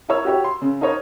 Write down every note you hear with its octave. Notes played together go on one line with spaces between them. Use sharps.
E4 A#4 C#5 E6
F#4 G4 C#5
C6
C#3
D#4 A#4 C5 C#5 D#5